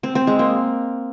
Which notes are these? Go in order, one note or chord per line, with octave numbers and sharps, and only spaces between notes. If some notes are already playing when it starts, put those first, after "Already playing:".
C4
C4
G#3
A#3